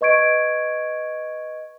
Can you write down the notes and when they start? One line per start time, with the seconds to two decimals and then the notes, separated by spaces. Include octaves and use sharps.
0.01 B4 D#5 C#6 G#6 D7